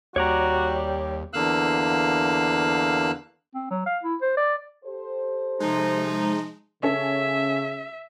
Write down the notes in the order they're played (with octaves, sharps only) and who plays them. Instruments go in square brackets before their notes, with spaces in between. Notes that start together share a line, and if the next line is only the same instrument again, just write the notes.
[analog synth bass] D#2 [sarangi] G3 [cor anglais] F#4 [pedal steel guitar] C#5 D5 A#5
[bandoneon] E2 D3 A#3 F5 E6 F#6
[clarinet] C4
F#3
F5
E4
C5
D5
[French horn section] G4 A4 C5
[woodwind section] C3 F3 D#4 [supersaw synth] G#3
[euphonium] C#3 [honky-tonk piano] C#4 A4 [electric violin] E5